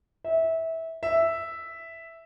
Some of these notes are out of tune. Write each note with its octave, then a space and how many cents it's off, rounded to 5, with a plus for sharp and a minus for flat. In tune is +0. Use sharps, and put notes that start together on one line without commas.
E5 -20
E5 +0